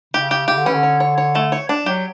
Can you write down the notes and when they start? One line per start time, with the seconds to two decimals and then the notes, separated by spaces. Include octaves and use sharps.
0.14 C#3 G4
0.31 G4
0.48 C#3 G4
0.57 D3
0.66 E3 C#4
0.74 D3
0.83 C#5
1.00 C#5
1.18 C#5
1.35 A3
1.52 C#5
1.69 D4
1.86 F#3 G4